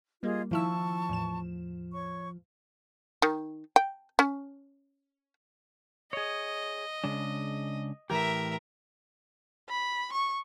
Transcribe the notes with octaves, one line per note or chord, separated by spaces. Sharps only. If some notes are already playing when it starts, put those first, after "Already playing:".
G3 A#3 F4 G#4 D#5
D#3 F3 E4 A5 C#6 E6
E2 A2 E7
C#5 C#6
D#3
G5
C#4
G#4 C#5 D#5
C#3 G#3 D4
A2 E3 G4 A#4 E5
B5
C#6